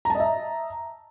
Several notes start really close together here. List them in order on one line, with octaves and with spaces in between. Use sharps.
A#5 A5 D#5 E5